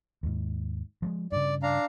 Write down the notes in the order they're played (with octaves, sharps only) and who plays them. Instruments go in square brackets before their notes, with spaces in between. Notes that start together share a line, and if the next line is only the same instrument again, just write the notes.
[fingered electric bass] D#2 G#2
F3 G3 G#3
[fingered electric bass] G2 C#3 [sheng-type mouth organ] D5
[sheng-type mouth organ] D4 F5 A#5